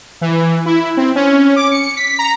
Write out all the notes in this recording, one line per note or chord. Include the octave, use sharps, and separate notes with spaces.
E3
E4
C4
C#4
D6
C#7
B6
A#5